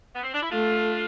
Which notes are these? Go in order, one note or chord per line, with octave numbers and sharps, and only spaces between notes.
B3
C4
D4
E4
A3 D4 F4